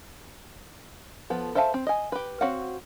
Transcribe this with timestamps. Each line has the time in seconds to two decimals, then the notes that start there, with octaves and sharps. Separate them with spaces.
1.30 F3 B3 A4
1.55 A4 C5 E5 F5 A5
1.74 C4
1.87 D#5 G#5
2.12 G4 B4
2.41 C4 F#4 C#5 F5 F#5